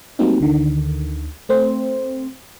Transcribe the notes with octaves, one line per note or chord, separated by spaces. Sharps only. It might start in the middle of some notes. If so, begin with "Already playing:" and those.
F#3 G3 A3 A#3 C4 D#4
D2 D3 D#3
A3 C4 C5